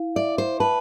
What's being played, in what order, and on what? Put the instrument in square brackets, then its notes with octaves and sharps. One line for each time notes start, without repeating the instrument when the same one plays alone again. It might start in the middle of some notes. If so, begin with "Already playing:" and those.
Already playing: [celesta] E4 F5
[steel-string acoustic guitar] D5 [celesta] E5
[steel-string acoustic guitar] C5
[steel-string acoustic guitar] B4 [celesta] A5